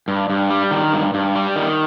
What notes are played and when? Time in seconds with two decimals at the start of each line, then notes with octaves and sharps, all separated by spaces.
0.08 G2
0.30 G2
0.50 G3
0.71 D#3
0.93 G2
1.14 G2
1.35 G3
1.56 D#3